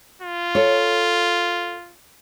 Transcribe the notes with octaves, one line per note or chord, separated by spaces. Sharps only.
F4
A4 C#5